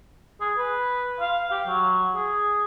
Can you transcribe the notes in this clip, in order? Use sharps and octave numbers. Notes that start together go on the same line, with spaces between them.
G#4
B4
F5
G4
F#3
G#4